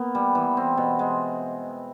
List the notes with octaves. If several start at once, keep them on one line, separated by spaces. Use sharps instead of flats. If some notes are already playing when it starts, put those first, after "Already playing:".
Already playing: A#3 B3
G3
E3
C4
B2
G#3